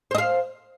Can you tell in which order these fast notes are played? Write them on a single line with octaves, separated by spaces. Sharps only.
C5 D#5 F5